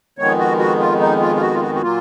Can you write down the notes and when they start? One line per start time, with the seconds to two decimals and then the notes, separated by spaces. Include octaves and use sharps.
0.18 F2 D#3 G#3 B3 C#5
0.39 F#4
0.59 F#4
0.80 F4
1.00 D#4
1.21 F4
1.36 F4
1.41 F#4
1.54 F4
1.62 F#4
1.75 F#4
1.82 A#2 F#3 A#3 F4